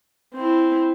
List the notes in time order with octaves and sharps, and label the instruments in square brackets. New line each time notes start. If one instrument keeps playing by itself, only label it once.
[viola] C4 E4